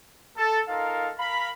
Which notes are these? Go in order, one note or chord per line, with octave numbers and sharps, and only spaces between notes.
A4
D#4 F4 A4 A#4 F5
A#4 F5 B5